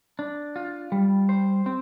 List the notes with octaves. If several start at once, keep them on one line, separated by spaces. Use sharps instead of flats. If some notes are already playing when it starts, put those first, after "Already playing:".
D4
F4
G3
C5
C4